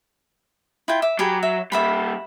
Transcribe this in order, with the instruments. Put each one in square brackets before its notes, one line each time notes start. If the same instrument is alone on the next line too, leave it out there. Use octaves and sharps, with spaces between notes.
[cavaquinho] E4 F4 G5
E5 D6
[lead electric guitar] F#3 [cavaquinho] G4 G#4 B5
[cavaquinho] E5
[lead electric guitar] G3 A#3 [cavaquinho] E5 F#5 B5